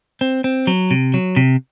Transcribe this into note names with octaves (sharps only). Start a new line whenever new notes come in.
C4
C4
F#3
C3
F#3
C3